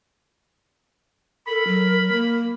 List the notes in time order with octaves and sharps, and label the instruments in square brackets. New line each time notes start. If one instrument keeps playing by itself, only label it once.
[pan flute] A4 [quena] A#4 [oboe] B5
[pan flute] F#3
A#3